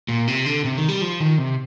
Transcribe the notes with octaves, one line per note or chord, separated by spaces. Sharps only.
A#2
C3
D3
C3
D#3
G3
F3
D#3
C3